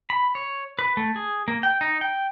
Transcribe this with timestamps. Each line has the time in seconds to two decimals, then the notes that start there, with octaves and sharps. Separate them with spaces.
0.10 B5
0.35 C#5
0.79 B4
0.97 A3
1.16 G#4
1.48 A#3
1.63 G5
1.81 D#4
2.01 G5